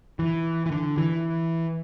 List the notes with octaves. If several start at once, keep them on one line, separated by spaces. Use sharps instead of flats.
E3
E3
D3
E3